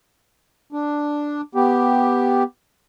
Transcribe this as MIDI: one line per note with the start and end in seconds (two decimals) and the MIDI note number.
0.73 1.41 62
1.55 2.43 59
1.55 2.43 67